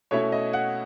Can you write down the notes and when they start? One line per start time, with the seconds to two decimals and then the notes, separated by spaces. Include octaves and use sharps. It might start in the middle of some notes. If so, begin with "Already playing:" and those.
0.11 B2 A3 C#4 E4 C#5
0.32 D#5
0.53 F#5